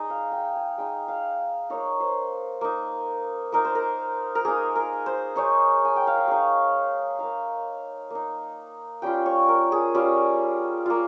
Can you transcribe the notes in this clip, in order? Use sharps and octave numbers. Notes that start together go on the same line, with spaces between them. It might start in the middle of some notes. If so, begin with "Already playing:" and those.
Already playing: G#3 D#4 D#5
F5
G5
G#5
G#3 D#4 G5
F5
A#3 D#4 C#5
C5
A#3 D#4
A#3 D#4 A#4
C5
A#4
A#4
A#3 D#4 G#4
A#4
C5
G#3 D#4 C#5
G#5
G5
F5
D#5
G#3 D#4 C#5
A#3 D#4 F5
A#3 D#4
G3 C#4 F4 G5
C#5
A#4
G#4
G3 C#4 F4
A#3 F4